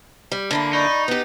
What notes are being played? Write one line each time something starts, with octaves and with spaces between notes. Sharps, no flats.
G3
D3 A#3 E4 A5 B5
D#4 D5 B5 C#6
B3 G4